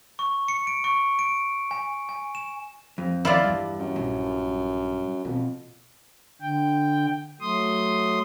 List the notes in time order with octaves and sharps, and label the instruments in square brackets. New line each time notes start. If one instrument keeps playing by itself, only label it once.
[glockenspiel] C#6
C#7
D7
C#6
D7
G#5
G#5
E7
[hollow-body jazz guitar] F2
[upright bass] D#2 [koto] E4 F4 D5
[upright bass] E2 [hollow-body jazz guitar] G2
[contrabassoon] F#2
[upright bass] A#1
[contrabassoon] F2 [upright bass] B2
[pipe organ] D3 G5
F#3 A3 C6 D#6